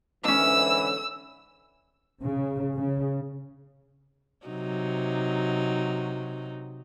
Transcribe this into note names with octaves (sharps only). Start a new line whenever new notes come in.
G#2 D3 E3 C#4 D4 E6
C#3
C#3
C3 F#3 D#4